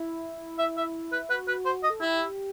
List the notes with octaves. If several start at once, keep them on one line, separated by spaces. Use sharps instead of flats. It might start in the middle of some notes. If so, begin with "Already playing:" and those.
Already playing: E4
E5
E5
B4
F#4 B4
B4
C5
D#5
A4
E4 G4